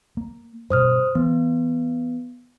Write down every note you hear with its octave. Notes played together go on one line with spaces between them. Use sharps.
A#3
G2 B2 C5 D#6 F6
E3 B3